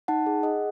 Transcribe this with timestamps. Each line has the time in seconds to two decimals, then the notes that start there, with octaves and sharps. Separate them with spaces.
0.08 D#4 F#5 A5
0.26 G#4
0.43 G#4 D#5 F#5